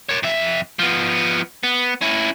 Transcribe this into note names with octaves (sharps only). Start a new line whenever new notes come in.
A#4 C#5
F2 E5
F3 B3
B3
C#4 E4